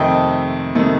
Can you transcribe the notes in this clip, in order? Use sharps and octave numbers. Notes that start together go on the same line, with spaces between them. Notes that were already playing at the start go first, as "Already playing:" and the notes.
Already playing: F2 C3 D#3 A3 D#5 G5
C3 D#3 A3